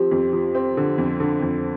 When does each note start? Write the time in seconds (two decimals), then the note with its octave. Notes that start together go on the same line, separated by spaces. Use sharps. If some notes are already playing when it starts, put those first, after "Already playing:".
Already playing: F3 C4 G4
0.11 F2
0.33 F3
0.55 C4
0.77 D3
0.98 F2
1.20 D3
1.42 F2